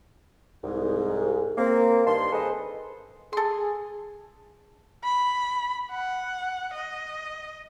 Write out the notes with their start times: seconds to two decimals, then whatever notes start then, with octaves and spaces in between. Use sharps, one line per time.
0.64 C2 G#2
1.58 A#3 C4
2.07 G2 D#3 A5 C6
2.33 G#4 A4 B4 C5 D#5
3.33 G#4 A4 C6
5.04 B5
5.91 F#5
6.74 D#5